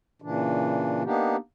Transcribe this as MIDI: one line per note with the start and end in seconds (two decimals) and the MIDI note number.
0.22 1.03 46
0.22 1.03 49
0.22 1.03 52
0.22 1.03 62
1.04 1.36 58
1.04 1.36 59
1.04 1.36 62
1.04 1.36 63
1.04 1.36 67